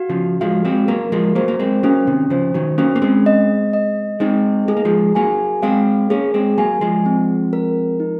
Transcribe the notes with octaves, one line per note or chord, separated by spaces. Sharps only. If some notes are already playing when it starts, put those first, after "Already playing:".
Already playing: F#4 F5
C#3 F3
F3 G#3 F5
G#3 C4
F#3 A#3 A#4
F3 G#3
F#3 A#3 C5
A#3
G#3 C4
F#3 A#3 C#4
C3 D#3
C#3 F3 C5
D#3 F#3
F#3 A#3 C#4
A#3
G#3 C4
D#5
D#5
G#3 C4 D#4
G#3 G#4
A#3
F3 G#3
F#3 A#3 G#5
G#3 C4 F5
A#3 C#4 G#4
G#3 C4
F#3 A#3 G#5
F3 G#3
C4
A#4
D#4